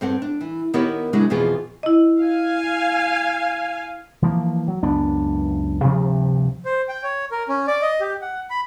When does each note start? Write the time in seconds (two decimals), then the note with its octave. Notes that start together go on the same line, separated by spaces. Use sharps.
0.01 G2 C4 A4 F#5
0.22 D4
0.41 E3
0.74 D#3 B3 E4 G4 A#4 C#5
1.13 C#3 F#3 G#3 D4 E4 G#4
1.30 F2 B2 E3 F4 G#4
1.83 E4 D#5
2.21 F5 G#5
4.22 E3 F3 A#3
4.68 F#3
4.83 C#2 F#2 B3 D4
5.82 D2 G2 C3 F3
6.65 C5
6.88 G5
7.03 C#5
7.32 A#4
7.49 C#4
7.67 D5
7.82 D#5
8.01 G4
8.22 F#5
8.50 B5